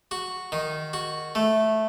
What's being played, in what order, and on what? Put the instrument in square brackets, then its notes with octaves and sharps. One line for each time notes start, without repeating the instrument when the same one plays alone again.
[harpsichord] F#4
D#3
F#4
A3